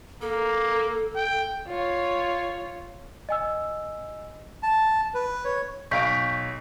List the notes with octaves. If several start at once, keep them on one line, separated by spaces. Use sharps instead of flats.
A#3 A4
G5
F4 C#5
D#5 G#5 E6
A5
B4
C#5
B1 F5 C#6 G6 B6 D7